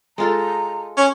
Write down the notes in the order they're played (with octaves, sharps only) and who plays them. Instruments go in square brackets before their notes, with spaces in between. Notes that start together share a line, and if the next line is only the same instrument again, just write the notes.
[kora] G#3 F4 A4 [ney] A#5
[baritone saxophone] C#4